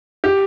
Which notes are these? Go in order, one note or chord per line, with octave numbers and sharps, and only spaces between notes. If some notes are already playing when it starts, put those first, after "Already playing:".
G4